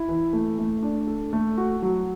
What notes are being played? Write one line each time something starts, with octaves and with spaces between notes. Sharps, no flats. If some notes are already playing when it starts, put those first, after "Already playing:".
Already playing: E4
E3
A3
A3
D4
A4
A3
F#4
F#3